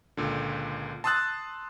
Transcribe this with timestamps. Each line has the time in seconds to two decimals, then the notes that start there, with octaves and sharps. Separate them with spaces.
0.17 C#2 A#2 D3
1.04 A5 C6 D#6 E6 F#6 A6